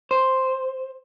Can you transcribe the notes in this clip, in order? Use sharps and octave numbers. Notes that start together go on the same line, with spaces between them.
C5